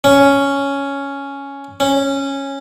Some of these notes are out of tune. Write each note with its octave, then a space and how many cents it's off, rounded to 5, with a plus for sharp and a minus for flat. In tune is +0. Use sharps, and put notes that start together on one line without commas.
C#4 +5
C#4 -10